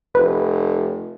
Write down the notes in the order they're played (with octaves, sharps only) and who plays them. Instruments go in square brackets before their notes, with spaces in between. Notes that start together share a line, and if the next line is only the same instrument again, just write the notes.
[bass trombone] F1 [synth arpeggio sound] B4